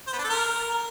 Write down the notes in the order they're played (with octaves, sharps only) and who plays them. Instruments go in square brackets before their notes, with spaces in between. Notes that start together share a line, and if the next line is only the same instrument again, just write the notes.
[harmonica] C5
B3
D4
A4
A#4